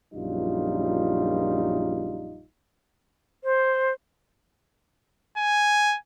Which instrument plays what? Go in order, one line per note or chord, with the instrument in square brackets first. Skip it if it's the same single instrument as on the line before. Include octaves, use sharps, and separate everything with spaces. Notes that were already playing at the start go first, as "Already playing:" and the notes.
[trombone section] A#1 F#2 G3 D#4 F4
[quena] C5
[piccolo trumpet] G#5